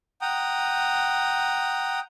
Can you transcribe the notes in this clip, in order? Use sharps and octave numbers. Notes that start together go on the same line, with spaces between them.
F#5 G5 A#5 D#6